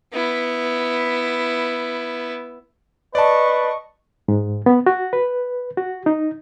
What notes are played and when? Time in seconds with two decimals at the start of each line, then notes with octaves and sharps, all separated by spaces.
0.13 B3 E4
3.15 B4 D5 D#5 A5 C#6
4.28 G#2
4.66 B3
4.86 F#4
5.13 B4
5.77 F#4
6.06 D#4